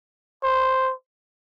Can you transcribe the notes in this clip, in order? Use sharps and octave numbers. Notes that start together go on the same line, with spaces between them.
C5